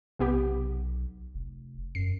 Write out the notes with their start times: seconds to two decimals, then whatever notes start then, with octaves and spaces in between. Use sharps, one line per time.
0.19 B1 C3 B3 G4
1.35 F1
1.95 F#2 C7